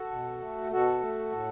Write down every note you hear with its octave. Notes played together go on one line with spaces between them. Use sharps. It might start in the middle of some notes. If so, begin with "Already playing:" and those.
Already playing: F#4 A4
B2
A3
B2 F#4 A4
A3
A2